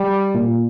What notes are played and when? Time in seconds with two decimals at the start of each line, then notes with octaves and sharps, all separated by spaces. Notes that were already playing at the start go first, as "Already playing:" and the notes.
Already playing: G3
0.34 A#2